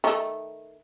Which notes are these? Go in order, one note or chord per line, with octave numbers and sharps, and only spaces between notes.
D#3 A3